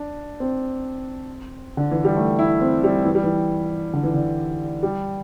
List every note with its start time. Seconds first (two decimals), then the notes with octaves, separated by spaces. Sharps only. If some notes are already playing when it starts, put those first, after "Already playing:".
Already playing: D4
0.40 C4
1.77 D3
1.91 E3
2.04 G3
2.16 A3
2.39 E4
2.61 C4
2.84 G3
3.05 E3
3.15 G3
3.24 E3
3.93 D3
4.03 E3
4.14 D3
4.83 G3